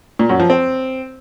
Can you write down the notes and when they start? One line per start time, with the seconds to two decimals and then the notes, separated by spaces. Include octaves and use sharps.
0.19 A#2
0.29 F#2
0.40 F3
0.50 C4